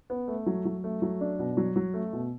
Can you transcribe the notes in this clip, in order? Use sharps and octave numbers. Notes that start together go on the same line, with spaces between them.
B3
A3
F#3
F#3
A3
F#3
D4
B2
F#3
F#3
A3
B2